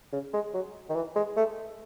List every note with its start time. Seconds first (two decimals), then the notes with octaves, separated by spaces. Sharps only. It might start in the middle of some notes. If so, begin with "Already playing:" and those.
0.13 C#3
0.33 G#3
0.54 F#3
0.89 D#3
0.95 E3
1.16 G#3
1.37 A3